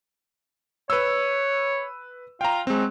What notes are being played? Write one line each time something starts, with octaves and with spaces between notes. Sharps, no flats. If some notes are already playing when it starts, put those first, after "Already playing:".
B4 C#5 E6
F4 G5 A#5
F#3 G#3 C4